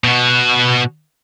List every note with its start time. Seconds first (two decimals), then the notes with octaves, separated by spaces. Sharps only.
0.04 B2 F#4